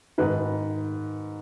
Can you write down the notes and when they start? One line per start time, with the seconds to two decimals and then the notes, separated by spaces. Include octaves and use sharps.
0.18 G#2 D#3 B4